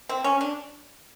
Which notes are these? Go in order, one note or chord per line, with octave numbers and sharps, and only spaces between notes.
C4
C#4
D4